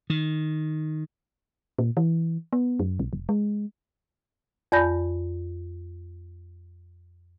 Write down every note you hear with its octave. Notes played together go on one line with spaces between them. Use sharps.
D#3
A#2
E3
B3
F#2
B1
F1
G#3
F2 D5 G#5 B5 G6 A#6